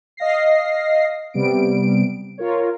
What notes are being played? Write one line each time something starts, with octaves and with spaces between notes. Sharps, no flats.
D#5 F5 A#6 C7
C3 G3 B3 D7
F4 A#4 C#5